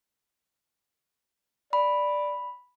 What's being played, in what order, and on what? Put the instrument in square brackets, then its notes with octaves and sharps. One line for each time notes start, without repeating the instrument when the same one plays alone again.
[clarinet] D5 [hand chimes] B5